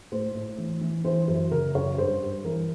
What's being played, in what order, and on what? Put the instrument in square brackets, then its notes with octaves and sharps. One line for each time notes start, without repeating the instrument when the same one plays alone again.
[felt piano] A2 C5
A2
E3
E3
E3 C5
F#2 C5
C#3 A#4
F#2 C#5
G2 C5
G2
E3 A#4